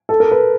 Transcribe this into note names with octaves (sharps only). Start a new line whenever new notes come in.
A4
A#4
B4